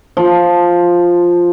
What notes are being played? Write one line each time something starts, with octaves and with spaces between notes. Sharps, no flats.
F3